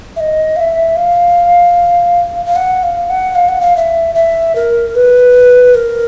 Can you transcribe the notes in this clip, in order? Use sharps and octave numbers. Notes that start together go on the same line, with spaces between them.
E5
D#5
F5
E5
F5
F5
F#5
F5
F#5
F5
F#5
F5
E5
E5
A#4
B4
A#4